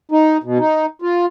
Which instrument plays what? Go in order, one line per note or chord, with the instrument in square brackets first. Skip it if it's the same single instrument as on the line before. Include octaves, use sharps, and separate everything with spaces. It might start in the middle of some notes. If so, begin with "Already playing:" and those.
[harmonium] D#4
B2
D#4
F4